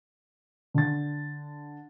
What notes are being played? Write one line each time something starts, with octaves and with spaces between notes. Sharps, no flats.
D3 A6